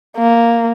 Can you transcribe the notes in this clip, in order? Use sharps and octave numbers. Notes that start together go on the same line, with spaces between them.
A#3